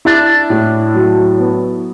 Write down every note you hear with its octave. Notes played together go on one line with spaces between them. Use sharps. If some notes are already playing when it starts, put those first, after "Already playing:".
D4 E4
A2
F#3
B3